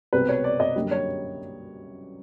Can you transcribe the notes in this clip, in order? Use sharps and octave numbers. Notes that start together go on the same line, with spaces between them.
C2 B2 G#3 C4 B4
C#5
D5
D#5
F#2 D3 G3 A#3
C#5